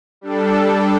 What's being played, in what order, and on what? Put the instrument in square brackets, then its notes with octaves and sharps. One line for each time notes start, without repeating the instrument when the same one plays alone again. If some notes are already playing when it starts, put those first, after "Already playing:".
[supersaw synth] G3 D4 A4